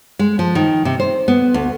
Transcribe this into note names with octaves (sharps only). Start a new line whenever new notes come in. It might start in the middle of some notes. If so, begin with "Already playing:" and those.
G#3
F3
D#3
C3
C5
B3
D2